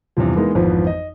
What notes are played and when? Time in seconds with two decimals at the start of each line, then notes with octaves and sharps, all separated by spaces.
0.17 E2 G2 C3 F3
0.36 E3 G#3 A#3 B3 D#4
0.55 G#1 F2 E3 F3 B3
0.87 D#5